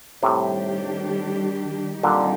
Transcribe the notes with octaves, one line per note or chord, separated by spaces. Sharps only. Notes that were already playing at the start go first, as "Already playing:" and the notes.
A2 C3 D#3 G3 D4 G4
A#2 D3 D#3 G3 C4 D#4 G4